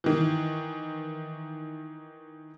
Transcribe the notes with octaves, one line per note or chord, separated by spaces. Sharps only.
D#3 E3